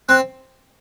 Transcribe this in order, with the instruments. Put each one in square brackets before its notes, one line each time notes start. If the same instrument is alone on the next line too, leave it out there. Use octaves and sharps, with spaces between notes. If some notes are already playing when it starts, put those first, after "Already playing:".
[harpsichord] C4 [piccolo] F#6